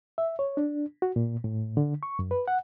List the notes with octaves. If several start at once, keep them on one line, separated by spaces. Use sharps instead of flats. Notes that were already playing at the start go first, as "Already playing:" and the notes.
E5
C#5
D4
F#4
A#2
A2
D3
C#6
F#2
B4
F#5